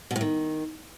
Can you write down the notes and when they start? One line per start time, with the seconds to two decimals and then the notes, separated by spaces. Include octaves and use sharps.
0.11 B2
0.16 A2
0.21 D#3